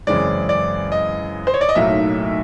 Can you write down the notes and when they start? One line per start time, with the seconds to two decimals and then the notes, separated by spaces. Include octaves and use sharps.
0.07 F#2 C#3 E3 G#3 C4 D5
0.49 D5
0.92 D#5
1.47 C5
1.54 C#5
1.61 D5
1.69 D#5
1.75 B1 A2 F#3 A#3 D#4 E5